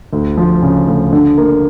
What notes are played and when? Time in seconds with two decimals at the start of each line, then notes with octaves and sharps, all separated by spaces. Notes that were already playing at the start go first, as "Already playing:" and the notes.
0.13 D2
0.37 F3
0.62 C#3
0.87 D2
1.12 D3
1.38 A#3